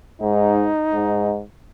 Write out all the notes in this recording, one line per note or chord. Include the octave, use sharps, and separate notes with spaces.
G#2 D#4
G#2